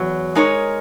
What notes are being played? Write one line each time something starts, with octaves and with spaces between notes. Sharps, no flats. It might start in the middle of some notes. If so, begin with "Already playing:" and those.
Already playing: E2 F#3
G#3 D#4 A#4 C#5